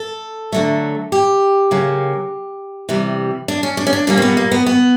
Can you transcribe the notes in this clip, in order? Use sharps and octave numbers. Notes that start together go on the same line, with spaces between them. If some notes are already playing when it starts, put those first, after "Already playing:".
Already playing: A4
D3 F#3 A3
G4
C#3 F#3 A#3
C3 E3 G3
D4
C#4
D4
C#4
D4
A#2 G3 A#3 C#4
C4
B3
A#3
B3
B3